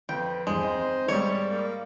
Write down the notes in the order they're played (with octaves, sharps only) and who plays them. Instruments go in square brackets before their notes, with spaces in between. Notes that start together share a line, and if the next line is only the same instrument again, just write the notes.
[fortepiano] F2 [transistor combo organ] B4 [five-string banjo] G5
[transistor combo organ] E2 G2 [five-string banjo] G#3 [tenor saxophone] C5
[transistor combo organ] C4 D#4 D#5
[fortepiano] G#2 G3 [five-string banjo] C#5 [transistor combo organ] D5
[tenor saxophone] A#3